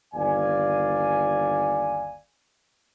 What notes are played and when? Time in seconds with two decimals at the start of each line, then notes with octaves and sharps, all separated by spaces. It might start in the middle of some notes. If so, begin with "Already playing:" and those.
0.14 G1 D#2 D5 F5 G#5